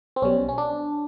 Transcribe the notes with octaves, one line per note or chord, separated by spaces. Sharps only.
C4
B1 B2 G3 C#4
C#4
D4